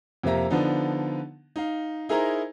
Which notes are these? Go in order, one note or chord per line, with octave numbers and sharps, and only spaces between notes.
F2 C3 A#3 E5 A#5
D3 F3 B3 D4 D#4
D#4 F5
D#4 E4 G#4 A#4 C5 A#5